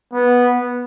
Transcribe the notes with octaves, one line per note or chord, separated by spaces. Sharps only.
B3